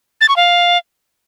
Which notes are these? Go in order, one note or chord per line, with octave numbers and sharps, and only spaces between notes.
A6
C#6
F5